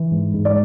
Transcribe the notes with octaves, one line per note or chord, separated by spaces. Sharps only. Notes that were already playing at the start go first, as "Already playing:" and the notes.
Already playing: E3
G#2
G#2
D5